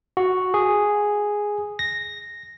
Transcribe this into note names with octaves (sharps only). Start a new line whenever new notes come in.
F#4
G#4
A#6